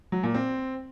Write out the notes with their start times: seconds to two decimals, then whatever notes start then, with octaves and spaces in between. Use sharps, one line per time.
0.12 F#3
0.23 A#2
0.34 C4